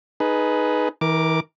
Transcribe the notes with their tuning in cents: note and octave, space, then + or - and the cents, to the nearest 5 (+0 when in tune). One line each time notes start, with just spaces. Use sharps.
D#4 +0 G#4 +20 B4 +0
E3 -40 A#4 +0 D6 +0